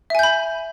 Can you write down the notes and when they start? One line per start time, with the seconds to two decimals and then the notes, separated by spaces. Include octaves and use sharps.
0.10 E5
0.15 G#5
0.19 G6
0.23 B5